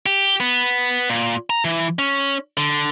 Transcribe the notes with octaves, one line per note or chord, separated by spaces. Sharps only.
G4
B3
A#2
A#5
E3
C#4
D3